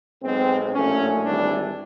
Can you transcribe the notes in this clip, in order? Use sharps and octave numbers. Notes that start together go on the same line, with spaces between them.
B1 B2 G#3 C4
A#1 A2 F#3 A3 C#4
G#1 G2 E3 G3 D4